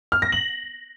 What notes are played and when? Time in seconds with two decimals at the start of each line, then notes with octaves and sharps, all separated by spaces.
0.12 F6
0.22 A#6
0.32 F#7